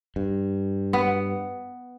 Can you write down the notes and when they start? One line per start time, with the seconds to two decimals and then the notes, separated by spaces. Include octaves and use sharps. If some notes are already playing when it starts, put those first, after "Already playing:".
0.16 G2
0.93 B3